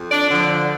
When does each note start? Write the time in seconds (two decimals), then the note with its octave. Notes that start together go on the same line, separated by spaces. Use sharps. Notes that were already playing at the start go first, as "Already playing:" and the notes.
Already playing: F2
0.11 D4 D5
0.30 D3 F3